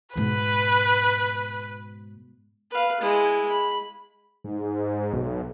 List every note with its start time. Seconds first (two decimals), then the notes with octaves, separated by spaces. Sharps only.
0.15 G#2 B2 B4
2.71 B4 F5
3.01 G#3 E4
3.48 B5
4.44 G#2
5.13 B1